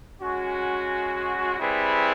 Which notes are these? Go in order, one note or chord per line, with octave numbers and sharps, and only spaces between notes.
G#3 C#4 F#4
G3 C4 E4 G#4 B4